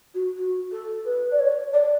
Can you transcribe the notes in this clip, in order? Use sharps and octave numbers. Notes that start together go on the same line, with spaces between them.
F#4
F#4
A4
B4
D5
C#5
D5